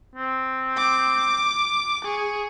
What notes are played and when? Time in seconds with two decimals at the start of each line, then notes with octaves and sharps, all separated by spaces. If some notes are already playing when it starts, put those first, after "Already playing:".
0.15 C4
0.77 D6
2.05 G#4 C#6